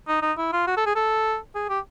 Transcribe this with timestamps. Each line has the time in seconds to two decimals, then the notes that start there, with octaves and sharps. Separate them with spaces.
0.08 D#4
0.22 D#4
0.38 E4
0.53 F4
0.67 F#4
0.77 A4
0.86 G#4
0.96 A4
1.55 G#4
1.69 G4